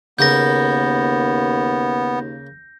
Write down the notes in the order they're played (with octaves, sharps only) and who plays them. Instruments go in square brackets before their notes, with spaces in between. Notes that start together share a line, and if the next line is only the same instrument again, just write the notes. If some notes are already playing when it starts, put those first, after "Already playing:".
[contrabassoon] D#2 [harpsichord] C#3 A#3 C#4 [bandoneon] B3 [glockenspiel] G6 A#6